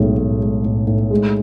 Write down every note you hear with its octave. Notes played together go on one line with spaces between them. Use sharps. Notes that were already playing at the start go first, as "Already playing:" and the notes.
Already playing: B1 A2 G#3
A2
G#3
A2
A2
G#3